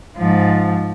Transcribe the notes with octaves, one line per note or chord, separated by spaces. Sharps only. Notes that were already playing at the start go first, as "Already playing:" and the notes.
G#2 F3